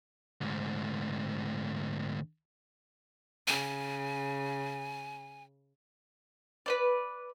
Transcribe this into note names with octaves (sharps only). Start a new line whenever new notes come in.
D2 G#2
C#3 G#5
B4 C5 D5